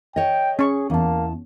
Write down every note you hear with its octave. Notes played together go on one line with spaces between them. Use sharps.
C#5 D#5 G5
C#4 G#4 C#6
E2 A#3 A5